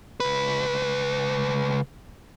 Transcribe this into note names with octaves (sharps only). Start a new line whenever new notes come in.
C#2 B4